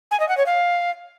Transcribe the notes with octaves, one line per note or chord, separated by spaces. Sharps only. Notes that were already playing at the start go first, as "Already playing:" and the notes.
G#5
D#5
F#5
C#5
F5